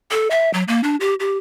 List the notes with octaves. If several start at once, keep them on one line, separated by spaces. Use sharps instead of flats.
A4
E5
F#3
A#3
D4
G4
G4